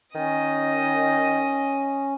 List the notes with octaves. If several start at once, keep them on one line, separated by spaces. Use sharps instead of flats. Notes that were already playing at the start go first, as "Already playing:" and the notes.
D#3 C#4 D#5